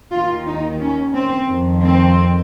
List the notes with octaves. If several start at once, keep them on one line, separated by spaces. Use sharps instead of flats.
D#2 D#3 F4
D#4
C#4
C4
F2 D#3
C4